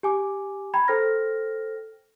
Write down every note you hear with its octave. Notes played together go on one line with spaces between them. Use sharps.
G4 G#5 D6
G5 A#5 B5 G#6
A4 C5 G5 F6 A#6